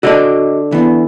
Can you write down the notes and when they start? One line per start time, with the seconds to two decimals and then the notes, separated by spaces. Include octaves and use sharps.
0.03 D3 D4 F#4 D#5
0.72 E3 B3